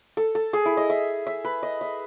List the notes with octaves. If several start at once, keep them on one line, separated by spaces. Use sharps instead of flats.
A4
A4
G#4
E4
D#5
E5
E5
B4
D#5
E5